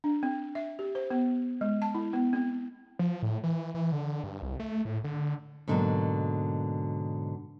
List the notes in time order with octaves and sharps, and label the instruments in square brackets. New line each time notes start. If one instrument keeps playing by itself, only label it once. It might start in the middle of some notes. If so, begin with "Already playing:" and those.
[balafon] D4
C4
E5
G4
C5
B3
G#3
A5
E4
B3
C4
[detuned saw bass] F3
A2
E3
E3
D3
G2
C2
A3
A2
D3
[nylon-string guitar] G#2 B2 D3 F3 F#3 A#3